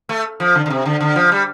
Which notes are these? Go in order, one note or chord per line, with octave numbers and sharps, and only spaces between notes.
A3
F3
D3
D3
C3
D3
D3
F3
G3